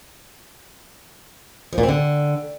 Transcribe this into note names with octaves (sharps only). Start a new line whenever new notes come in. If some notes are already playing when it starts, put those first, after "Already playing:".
F3
A#2
C4
D3